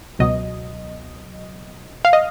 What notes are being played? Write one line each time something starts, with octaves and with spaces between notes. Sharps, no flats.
C#2 B2 F#3 D#5
F5
D#5